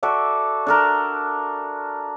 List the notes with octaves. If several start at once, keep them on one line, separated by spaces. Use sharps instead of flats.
F#4 A4 D5 E5
D4 A4 A#4